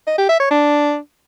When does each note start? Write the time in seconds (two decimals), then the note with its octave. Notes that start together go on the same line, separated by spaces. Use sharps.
0.07 D#5
0.18 G4
0.29 E5
0.40 C#5
0.51 D4